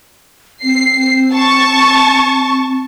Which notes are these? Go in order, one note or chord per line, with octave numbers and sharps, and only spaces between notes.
C4 C7
A5 C#6